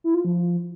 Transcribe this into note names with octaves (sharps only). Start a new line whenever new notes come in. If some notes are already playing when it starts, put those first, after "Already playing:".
E4
F4
F3